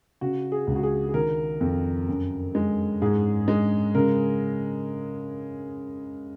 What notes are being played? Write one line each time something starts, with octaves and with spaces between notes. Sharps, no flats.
C#3 F#4
G#4
C#2
F#4
G#4
G#4
D#3 A#4
F2
F#2
G#3
G#2 G#4
G#3
C#3 A#4